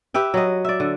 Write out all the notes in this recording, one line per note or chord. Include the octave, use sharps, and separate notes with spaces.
G4 B4 E5 G5
F#3 D#5
D5 E5
D3